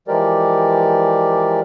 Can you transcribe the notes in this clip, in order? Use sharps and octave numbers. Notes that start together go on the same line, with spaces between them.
E3 F3 G#3 G4 A#4 D5